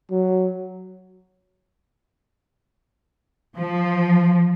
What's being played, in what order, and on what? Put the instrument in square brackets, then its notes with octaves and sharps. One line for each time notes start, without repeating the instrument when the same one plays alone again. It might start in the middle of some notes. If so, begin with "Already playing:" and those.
[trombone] F#3
[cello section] F3